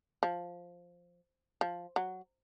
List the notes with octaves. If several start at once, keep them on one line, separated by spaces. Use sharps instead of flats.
F3
F3
F#3